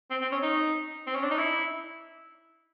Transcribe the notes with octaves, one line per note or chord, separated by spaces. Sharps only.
C4
C4
C#4
D#4
C4
C#4
D4
D#4
E4